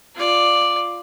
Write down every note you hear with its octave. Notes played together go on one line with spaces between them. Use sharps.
F4 D5